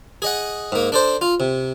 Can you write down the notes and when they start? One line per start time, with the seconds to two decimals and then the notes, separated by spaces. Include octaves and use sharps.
0.22 G#4 D#5 F#5
0.72 G#2 A#3
0.92 D4 A4 C5
1.21 F4
1.40 C3